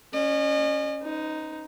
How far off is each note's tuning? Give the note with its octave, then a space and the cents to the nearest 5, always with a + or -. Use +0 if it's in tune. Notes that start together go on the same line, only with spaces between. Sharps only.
C#4 +0 D#5 -40
D#4 +0 B4 +45